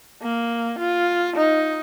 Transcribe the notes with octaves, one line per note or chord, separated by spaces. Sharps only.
A#3
F4
D#4